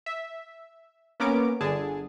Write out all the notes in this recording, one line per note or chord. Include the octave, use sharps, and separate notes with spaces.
E5
A#3 B3 C#4 A#4 D6 D7
G1 D3 G#4 A5